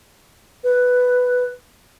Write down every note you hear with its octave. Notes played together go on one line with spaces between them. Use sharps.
B4